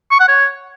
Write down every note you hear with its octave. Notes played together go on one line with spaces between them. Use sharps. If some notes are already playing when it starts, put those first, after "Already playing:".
C#6
F#5
C#5